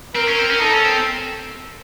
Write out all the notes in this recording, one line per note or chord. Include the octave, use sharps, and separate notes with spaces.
C4 A#4
C#4
C4
C#4
D#4 A4
C#4
C4